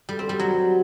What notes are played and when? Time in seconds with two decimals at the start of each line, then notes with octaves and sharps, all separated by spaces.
0.09 G3
0.19 C4
0.29 G3
0.39 F#3